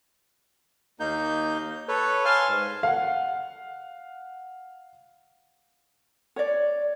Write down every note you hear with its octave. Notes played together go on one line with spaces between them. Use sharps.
D#2 A#3 D#4 G6
A4 B4 C#5
F5 G#5 A5 C6 F6
G#2
F5 F#5
C#5 D5